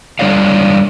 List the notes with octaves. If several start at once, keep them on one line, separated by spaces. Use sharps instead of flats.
G3 D4 C#5 D5 F5